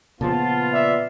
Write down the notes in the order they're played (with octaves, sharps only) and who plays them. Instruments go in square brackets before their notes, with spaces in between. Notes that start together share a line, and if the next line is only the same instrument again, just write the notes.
[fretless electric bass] A#2 C#3 F3 [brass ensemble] B3 F4 [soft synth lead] A5
[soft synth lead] D5 [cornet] E5